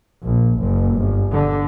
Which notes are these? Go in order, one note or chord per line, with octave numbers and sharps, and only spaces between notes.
A#1
F#1
G1
D3